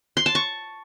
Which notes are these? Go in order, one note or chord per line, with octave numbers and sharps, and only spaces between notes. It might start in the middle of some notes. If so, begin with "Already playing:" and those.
C6
A5
C#6